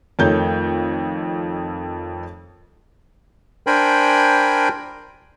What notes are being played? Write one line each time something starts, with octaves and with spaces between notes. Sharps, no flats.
F2 D#3 A3 D#4 C#5 G6
D4 A#4 C5 G5 G#5 B5